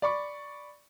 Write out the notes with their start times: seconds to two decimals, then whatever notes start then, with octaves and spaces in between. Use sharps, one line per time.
0.02 D5 B5 C#6